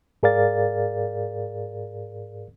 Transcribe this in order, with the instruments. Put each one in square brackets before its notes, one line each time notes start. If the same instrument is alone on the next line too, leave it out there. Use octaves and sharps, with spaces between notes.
[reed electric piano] G#2 G#4 A#4 D5 F5 A6